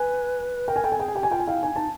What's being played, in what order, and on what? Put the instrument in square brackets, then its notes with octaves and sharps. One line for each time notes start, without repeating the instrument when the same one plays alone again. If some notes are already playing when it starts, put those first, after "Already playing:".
Already playing: [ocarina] B4 [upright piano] G#5
[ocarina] A#4 [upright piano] G5
[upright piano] G#5
[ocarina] A4 [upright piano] G5
[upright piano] G#5
[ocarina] G#4 [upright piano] G5
[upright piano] G#5
[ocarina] G4 [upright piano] G5
[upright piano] G#5
[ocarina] F4 [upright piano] G5
[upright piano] G#5
[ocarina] E4 [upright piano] F5 G5
[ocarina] D#4 [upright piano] G#5
[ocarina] D#4 [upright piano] A5